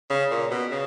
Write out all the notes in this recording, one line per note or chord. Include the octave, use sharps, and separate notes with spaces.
C#3
A#2
B2
C#3